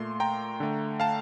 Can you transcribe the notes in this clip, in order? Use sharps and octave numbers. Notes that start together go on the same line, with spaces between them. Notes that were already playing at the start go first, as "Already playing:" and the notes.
Already playing: A#2 A3 C6
G5 A#5
D3 A3
F5 A5